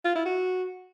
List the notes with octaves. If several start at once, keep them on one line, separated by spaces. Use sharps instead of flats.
F4
E4
F#4